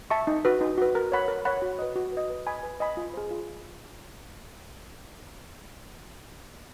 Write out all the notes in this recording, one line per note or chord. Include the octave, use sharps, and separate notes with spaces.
E5 A5 C#6
D#4
F#4 B4
D#4
F#4 B4
A#4
C#5 F#5 B5
A#4
C#5 F#5 B5
F#4
B4 D#5
F#4
B4 D#5
B4
D#5 G#5 B5
B4
D#5 G#5 B5
F4
G#4 C5
F4